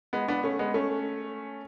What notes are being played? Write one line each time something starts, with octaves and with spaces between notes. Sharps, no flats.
G#3 B3
B3 D4
A3 C#4
G#3 B3
A3 C#4